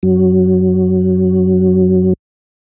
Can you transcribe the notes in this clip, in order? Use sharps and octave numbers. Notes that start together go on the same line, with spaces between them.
F#2 F#3